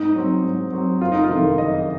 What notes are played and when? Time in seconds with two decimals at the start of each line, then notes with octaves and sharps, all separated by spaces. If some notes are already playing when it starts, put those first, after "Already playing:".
Already playing: G#2 D#4
0.15 F#3 C4
0.44 G#2
0.72 F#3 C4
1.01 F#1 F4
1.12 D#4
1.24 F4
1.29 F2 C3 D#3
1.58 F#1 D#5